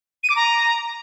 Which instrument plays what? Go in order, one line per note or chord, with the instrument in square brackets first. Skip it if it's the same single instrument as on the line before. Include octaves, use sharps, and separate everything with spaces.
[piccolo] D#7
D6
A#5